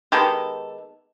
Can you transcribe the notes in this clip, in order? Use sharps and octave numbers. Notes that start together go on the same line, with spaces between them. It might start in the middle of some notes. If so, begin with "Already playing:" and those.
D#3 G#3 B3 G4 A4